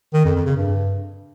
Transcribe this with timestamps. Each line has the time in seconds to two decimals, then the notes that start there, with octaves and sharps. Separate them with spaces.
0.14 D#3
0.24 F2
0.35 F2
0.46 C#3
0.57 G2